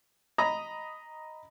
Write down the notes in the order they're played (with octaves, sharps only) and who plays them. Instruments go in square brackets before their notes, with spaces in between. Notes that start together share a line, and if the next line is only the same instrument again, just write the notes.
[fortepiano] D#5 A#5 B5 D#6